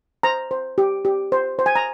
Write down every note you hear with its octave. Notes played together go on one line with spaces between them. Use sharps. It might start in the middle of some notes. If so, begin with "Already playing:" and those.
C5 A#5
C5
G4
G4
C5
C5
G#5
A#5